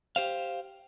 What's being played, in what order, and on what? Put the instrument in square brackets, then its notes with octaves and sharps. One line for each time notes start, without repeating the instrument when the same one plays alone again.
[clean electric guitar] G4 C5 F5